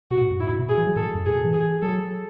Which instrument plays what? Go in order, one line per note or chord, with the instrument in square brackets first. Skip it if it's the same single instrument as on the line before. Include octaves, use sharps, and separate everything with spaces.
[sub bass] B2 [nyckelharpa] F#4
[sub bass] A2
F#2
[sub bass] G#2 [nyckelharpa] E4
[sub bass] A2
B2
[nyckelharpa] G#4
[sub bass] E3
F#3
[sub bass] A2 [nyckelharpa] A4
[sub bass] F#2
[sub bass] A2 [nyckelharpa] G#4
[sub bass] B2
E3
[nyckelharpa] G#4
[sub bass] F#3 [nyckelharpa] A4